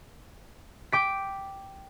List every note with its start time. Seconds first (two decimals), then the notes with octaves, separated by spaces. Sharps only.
0.92 G5 D6 B6